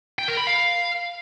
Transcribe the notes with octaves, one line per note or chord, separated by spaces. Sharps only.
G5
A#4
B5
F5